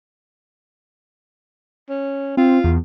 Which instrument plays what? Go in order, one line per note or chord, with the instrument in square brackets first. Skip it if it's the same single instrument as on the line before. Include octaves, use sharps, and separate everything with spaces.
[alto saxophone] C#4
[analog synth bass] C4 [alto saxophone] F4
[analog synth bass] E2